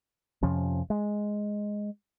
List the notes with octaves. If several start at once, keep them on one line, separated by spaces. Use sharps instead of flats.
F2 C3 F3 C#4
G#3